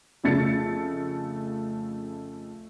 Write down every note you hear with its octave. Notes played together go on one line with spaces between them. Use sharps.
F2 C#3 A3 A6 C#7